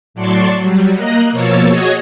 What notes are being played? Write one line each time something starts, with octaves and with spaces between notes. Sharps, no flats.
A2 F#3 D5 A5 C6 C#6
F#3 G3
A#3 D#5 A#5 F#6
B2 F3 A#3 C#5 E6 A6
F#4 G#4 C#5 D#5 G#5